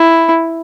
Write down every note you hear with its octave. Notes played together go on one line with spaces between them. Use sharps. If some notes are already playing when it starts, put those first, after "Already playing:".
Already playing: E4